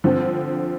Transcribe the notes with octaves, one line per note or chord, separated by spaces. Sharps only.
D3 F3 C4